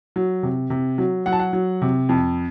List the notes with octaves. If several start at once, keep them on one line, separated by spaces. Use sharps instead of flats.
F#3
C3
C3
F#3
F#3 F#5
A5
F#5
F#3
C3
F2